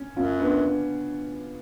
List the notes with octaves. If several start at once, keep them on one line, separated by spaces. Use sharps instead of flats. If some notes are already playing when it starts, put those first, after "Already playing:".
Already playing: C#4
F#2 C#4 F4
B3 D4